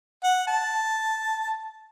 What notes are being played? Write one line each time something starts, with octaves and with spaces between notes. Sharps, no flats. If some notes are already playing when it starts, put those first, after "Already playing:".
F#5
A5